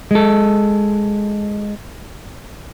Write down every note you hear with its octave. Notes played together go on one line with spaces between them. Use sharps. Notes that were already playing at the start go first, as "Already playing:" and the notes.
G#3 A4